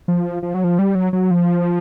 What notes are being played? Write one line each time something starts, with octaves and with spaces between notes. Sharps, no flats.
F3
F3
F#3
F3
G3
F#3
F#3
F3